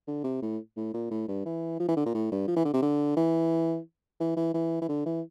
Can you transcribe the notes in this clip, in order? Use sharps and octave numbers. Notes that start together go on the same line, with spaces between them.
D3
C3
A2
A2
A#2
A2
G2
E3
F3
E3
D3
A#2
A2
G2
F3
E3
D3
C3
D3
E3
E3
E3
E3
E3
D3
E3